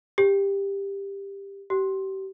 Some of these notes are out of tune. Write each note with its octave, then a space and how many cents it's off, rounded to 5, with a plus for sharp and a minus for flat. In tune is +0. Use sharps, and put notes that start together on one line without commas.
G4 +15
G4 -30